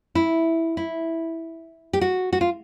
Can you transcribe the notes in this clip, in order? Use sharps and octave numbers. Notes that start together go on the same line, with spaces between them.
E4
E4
G4
F#4
F#4
F4